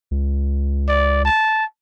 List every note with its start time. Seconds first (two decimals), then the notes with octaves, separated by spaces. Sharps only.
0.11 C#2
0.88 D5
1.25 A5